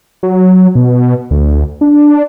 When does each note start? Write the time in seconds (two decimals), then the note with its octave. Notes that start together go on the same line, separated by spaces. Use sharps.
0.23 F#3
0.75 B2
1.31 D2
1.81 D4